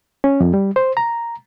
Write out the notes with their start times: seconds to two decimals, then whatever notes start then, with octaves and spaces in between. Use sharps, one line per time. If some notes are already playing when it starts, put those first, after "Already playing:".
0.24 C#4
0.40 F2
0.54 G3
0.76 C5
0.97 A#5